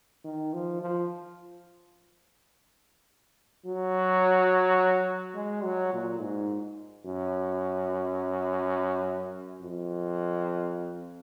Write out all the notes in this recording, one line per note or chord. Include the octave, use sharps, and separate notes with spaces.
D#3
F3
F3
F#3
G#3
F#3
A#2
G#2
F#2
F2